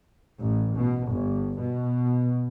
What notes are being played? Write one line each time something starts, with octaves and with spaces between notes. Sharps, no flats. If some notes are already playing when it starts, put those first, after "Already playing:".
A1
B2
G1
B2